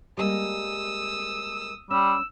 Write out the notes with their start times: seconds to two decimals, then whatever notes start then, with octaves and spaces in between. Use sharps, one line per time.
0.17 G3 G#3 A#3 D#6 E6
1.91 G3 C#4 E6